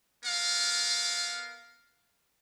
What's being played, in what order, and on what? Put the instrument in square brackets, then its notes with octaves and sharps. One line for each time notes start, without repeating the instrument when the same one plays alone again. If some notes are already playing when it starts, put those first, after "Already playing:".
[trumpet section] B3 A#4 F5